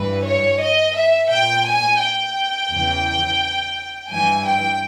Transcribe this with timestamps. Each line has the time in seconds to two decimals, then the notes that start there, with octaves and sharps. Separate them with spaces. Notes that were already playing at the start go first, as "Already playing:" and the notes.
Already playing: G2 E3 B4
0.23 C#5
0.59 D#5
0.94 E5
1.29 A#2 G5
1.65 G#5
2.00 G5
2.70 E2 C#3 E3
4.10 G2 E3 G#5
4.46 G5